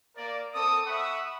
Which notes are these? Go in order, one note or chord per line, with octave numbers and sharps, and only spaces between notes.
A#3 A#4 D5
C4 A4 D6 D#6
E5 F#5 B5 C#6 D#6